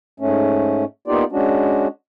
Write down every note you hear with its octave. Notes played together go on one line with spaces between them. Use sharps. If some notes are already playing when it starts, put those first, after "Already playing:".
G#2 A3 C#4
A#3 B3 D#4 F4 G4 D5
G#3 C#4 D4 F#4